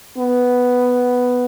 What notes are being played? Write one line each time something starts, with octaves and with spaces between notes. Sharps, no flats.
B3